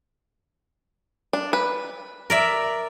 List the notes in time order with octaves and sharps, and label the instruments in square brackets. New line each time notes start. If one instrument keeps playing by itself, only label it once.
[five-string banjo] D4
B4
[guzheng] A#4 D5 E5